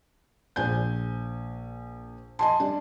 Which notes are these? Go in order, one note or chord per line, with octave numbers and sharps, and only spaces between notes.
A#1 G#5 G6
D#5 G#5 A5 C6
G3 D4